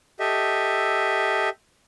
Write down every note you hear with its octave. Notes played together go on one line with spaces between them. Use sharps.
G4 A4 D#5 E5